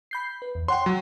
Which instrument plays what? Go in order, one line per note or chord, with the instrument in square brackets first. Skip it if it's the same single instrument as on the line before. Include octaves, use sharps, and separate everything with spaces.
[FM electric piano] B5 G6 C7
B4
E2
[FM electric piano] C#5 F#5 G5 [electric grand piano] C6
[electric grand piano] F#3